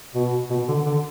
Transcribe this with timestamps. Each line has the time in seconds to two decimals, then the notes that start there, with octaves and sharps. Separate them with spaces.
0.15 B2
0.50 B2
0.68 D3
0.86 D3